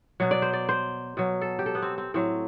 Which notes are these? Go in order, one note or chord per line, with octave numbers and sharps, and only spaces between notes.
B2 F#3
D5
C5
D5
C5
B2 F#3
A4
G4
A4
B3
C4
C4
A2 F#3 C4